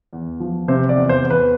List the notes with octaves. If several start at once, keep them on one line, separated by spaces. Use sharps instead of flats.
E2
F3
C3 C5
D5
E2
C5
E2
B4